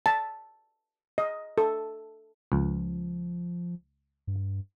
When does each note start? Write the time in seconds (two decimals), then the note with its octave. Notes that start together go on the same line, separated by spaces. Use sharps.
0.06 A5
1.18 D#5
1.58 A4
2.52 C#2 F3
4.27 G2